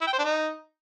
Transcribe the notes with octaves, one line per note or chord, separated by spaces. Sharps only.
E4
G5
C5
D4
D#4